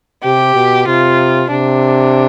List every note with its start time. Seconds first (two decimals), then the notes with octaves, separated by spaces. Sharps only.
0.23 C3 G4
0.55 B2
0.87 C3 F4
1.51 C3 D4